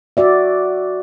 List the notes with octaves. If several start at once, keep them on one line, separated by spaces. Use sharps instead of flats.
F#4 D5 E5